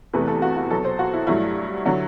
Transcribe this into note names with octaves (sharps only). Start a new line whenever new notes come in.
E2 C3 E3 A3 B4
A4
F#4
F#4
B2 F#3 B3 A4
C5
F#4
E4
G2 F#3 A3 E4
D3 F#3